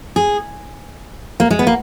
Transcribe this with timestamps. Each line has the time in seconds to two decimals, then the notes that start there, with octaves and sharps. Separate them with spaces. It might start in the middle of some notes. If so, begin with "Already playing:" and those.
0.16 G#4
1.40 A#3
1.51 G#3
1.59 B3
1.67 A#3